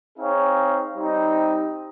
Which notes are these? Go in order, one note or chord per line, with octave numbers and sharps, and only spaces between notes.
C4 D#4 G#4 C#5 F5
G3 C4 D#4